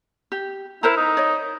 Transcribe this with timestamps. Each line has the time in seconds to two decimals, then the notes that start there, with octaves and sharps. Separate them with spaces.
0.32 G4
0.83 E4 A#4 C5 A#5
0.97 D#4
1.17 C#5 D#5